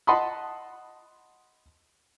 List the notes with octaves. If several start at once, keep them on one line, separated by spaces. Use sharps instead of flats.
D#5 F#5 A5 B5 C6 D#6